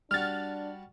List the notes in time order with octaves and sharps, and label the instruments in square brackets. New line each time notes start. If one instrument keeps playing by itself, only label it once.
[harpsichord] G3 F#4 [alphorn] D4 [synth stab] F6 A6